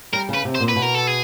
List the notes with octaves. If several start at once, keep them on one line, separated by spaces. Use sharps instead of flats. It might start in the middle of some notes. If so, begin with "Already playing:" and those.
G3 A#4
C#3
B4
C3
C5
A#2
B4
B2
A#4
A4
G#4